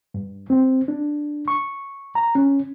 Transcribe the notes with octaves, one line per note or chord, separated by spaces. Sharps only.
G2
C4
D4
C#6
A#5
C#4